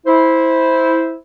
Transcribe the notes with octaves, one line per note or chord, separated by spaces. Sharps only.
E4 C5